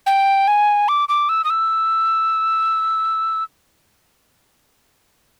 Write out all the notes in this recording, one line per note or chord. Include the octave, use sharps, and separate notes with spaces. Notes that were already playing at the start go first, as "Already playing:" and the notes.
G5
G#5
D6
D6
E6
D#6
E6